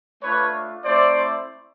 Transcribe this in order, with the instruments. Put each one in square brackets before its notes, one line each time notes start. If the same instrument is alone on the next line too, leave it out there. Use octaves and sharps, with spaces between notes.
[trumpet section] A3 D4 F4 B4 C#5
A3 C4 E4 C5 D5